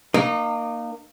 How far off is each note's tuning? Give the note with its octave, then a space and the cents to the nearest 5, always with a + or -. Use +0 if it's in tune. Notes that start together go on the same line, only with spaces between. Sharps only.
A#3 +0 D#4 -30